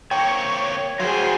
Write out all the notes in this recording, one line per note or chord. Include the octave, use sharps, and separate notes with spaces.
A#3 C4 C#5 G5 C#6
D#3 F#3 F4 G#4 C5 G5